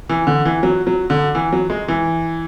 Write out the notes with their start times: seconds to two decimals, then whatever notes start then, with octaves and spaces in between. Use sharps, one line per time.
0.09 E3
0.27 D3
0.45 E3
0.63 F#3
0.87 F#3
1.10 D3
1.35 E3
1.53 F#3
1.70 G#3
1.88 E3